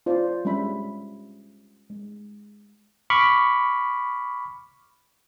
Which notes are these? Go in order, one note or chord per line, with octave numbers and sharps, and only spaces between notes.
F4 C5 D5
G3 G#3 C#4 E5 B5
G#3
B5 C#6 D6 F6